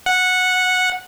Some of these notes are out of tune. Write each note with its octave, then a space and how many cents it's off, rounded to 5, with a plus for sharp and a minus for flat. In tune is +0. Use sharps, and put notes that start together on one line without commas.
F#5 -10